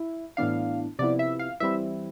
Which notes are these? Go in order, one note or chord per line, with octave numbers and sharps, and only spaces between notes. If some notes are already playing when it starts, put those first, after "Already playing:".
Already playing: E4
A2 E3 B3 D4 F5
C3 F3 B3 E4 D5
E5
F5
E3 G3 C4 E4 E5